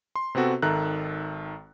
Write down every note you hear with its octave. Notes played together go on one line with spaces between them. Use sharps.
C6
C3 B3 C4 F#4 A4
G#1 D#3 A4 E5 A#5 F#6